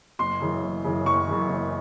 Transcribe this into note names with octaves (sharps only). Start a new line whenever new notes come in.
F#1 C6
F#2 C#3 E3
F#1
F#2 C#3 E3
F#1 C#6
F#2 C#3 E3
F#1